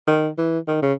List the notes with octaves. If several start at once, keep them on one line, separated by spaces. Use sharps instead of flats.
D#3
E3
D#3
C#3